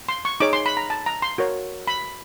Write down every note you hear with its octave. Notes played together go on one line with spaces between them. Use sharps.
C6
C#6
D#4 G#4 C#5 D6
C6
B5
A#5
A5
A#5
C6
F#4 A#4 C#5
B5